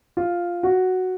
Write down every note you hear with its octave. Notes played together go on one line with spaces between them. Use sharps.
F4
F#4